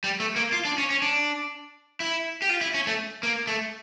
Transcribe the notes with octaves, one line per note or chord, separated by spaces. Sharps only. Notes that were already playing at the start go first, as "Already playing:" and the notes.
G3
A3
A#3
F4
D4
C#4
C#4
D4
E4
G4
F4
E4
C#4
A3
A#3
A3